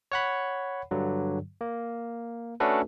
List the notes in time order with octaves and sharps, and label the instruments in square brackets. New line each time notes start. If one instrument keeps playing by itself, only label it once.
[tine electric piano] C#5 F#5 B5
G2 D3 F#3
A#3
A3 C#4 D4 F#4 A4 B4